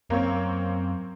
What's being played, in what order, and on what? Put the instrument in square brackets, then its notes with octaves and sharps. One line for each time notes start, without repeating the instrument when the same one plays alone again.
[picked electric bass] F#2 [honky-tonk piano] A#3 C4 C#5